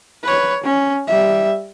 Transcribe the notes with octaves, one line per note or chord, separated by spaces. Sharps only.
B4 C#5
C#4
G3 E5